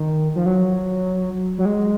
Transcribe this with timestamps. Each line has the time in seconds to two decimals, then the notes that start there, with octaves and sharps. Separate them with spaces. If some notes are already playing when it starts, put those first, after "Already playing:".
Already playing: D#3
0.36 F3
0.46 F#3
1.58 F#3
1.65 G#3